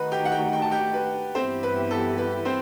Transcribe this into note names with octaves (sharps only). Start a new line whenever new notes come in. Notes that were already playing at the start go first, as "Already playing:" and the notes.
Already playing: D#3 A3 D#4 F#4 B4 B5
G4 G5
F#5
G4 G5
G5
A5
G4 G5
B4
G2 E3 B3 C4 E4 G4 C5
B4
A4
B4
C4 C5